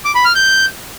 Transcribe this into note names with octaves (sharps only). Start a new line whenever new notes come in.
D6
B5
F6
G6